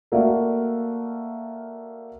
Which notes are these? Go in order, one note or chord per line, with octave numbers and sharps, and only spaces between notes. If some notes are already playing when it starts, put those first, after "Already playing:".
A3 A#3 F#4 D5 E5 F5